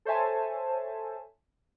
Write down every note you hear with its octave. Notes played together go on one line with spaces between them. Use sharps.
A4 C5 C#5 E5 G#5 A5